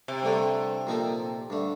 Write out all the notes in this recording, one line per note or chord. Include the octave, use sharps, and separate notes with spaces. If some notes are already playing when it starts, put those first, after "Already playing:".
C3
G2 D3 A3 C4
A#2 F3 C4 D#4 A4
G2 D3 A3